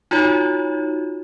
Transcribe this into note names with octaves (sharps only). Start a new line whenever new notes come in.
D#4 F4 F#4 C#5